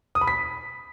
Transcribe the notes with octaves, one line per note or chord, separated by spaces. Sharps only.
D#6
B5
B6